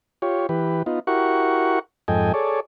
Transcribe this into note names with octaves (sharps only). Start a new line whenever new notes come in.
F4 G4 C#5
E3 G4 B4
B3 D#4 F4
E4 F#4 G4 A#4 F#5 C#6
F2 G#2 A4 D#5 G5 G#5
G#4 A4 C#5 D5